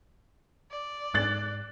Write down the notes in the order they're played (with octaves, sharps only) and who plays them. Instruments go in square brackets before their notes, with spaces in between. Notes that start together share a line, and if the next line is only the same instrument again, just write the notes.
[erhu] D5
[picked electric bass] G#2 [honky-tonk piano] F#6 A6 F#7